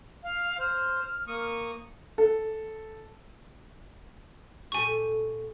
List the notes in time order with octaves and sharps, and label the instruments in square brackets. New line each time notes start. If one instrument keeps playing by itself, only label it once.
[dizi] F5
[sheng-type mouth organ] C5 [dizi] F6
[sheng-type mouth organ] A#3 C#6 D#6
[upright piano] A4
[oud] A#2 G4 A4 [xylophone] G#5 C#6